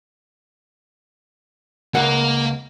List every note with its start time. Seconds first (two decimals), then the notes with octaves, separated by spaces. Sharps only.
1.95 C#2 A#3 A#4 F#5